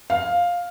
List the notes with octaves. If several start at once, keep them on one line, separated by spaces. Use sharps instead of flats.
F5